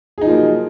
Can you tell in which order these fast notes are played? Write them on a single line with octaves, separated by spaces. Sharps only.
G#4 D#4 F3 A#3 F#3